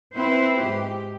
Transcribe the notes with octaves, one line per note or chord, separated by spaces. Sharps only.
C4 E4 B4 C5
G#2 G4